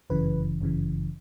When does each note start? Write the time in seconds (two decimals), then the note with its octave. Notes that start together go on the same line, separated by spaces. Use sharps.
0.10 G1 F#2 C#3 E3 B4
0.61 G1 F#2 C#3 E3